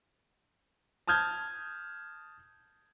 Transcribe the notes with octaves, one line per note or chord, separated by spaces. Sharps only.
A5 D#6 F6 G6 G#6